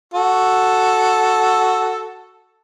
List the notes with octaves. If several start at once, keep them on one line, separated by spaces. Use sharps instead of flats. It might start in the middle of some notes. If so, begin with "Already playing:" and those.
F#4 A4